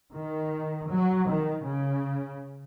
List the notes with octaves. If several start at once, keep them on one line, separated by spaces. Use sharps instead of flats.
D#3
F#3
D#3
C#3